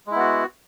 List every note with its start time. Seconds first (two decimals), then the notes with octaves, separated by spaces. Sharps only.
0.07 G#3
0.11 E4
0.15 B3
0.19 F#4